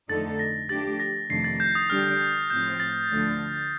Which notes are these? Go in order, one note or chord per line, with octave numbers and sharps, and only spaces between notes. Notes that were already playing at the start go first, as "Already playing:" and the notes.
F2 D3 A3 D#4 A4 A6
A#6
F3 A3 D4 G4 A6
A#6
F2 C3 D#3 A3 D4 C7
A6
G6
D#6
D3 G3 D4 G4 F6
A2 F3 C4 G6
A6
D2 D3 F3 A3